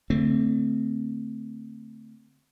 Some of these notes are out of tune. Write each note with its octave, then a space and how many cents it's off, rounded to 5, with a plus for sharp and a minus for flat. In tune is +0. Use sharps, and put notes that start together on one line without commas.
D3 -15 A3 +25 C4 +0